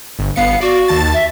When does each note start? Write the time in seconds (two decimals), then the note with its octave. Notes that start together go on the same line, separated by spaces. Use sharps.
0.19 G1
0.36 G1 B3 F5 C#7
0.61 F#4 D5
0.88 D#2 A5 A6
1.13 E5